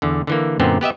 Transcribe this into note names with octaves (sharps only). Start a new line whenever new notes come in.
E2 D3
D3 E3 A#3
F#2 A#2 D3 B3 C4
B3 G4 D#5 E5